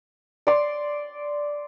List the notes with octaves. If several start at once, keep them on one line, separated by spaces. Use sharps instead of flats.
D5 C6